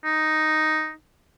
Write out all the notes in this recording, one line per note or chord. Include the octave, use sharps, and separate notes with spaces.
D#4